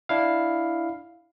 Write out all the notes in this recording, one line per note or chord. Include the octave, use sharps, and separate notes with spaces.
D4 E4 F5